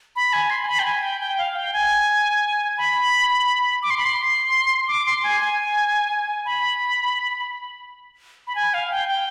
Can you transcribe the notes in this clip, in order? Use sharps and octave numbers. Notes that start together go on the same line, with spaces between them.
B5
G#5
C6
G#5
B5
G5
G#5
G5
G5
F5
G5
G#5
B5
D6
C6
B5
C6
D6
C6
G#5
G#5
B5
B5
G#5
F5
G5
G5